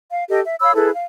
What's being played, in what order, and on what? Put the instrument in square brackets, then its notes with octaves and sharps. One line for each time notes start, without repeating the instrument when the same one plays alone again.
[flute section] F5
G4 A4 D#5
E5
C#5 F5 B5 E6
E4 G#4 A4 B4
F5